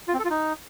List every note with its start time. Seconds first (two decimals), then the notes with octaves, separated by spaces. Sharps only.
0.08 F4
0.14 C4
0.19 A4
0.25 F4
0.30 D#4